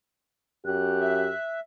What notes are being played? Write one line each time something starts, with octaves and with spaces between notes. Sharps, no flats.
F#2 G4 F#6
E5